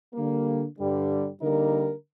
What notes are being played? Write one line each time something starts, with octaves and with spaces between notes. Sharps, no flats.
D3 G3 A#3
G2 D3 G3
D3 G3 A#3 D#4 A#4